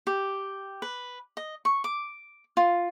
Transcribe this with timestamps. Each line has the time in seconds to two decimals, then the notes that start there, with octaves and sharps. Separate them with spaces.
0.07 G4
0.82 B4
1.37 D#5
1.65 C#6
1.84 D6
2.57 F4